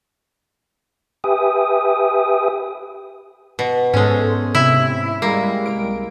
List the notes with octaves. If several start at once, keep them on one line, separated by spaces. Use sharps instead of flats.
G4 B4 E5 G5 G#5 D#6
B2
G#2 G#3 B3 C#4 A4 C5
C3 E4
G3 G#3 A#3
C2 A#4 D7